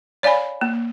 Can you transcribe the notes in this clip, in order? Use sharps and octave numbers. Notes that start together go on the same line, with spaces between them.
C#5 D5 F5 G#5 B5
A#3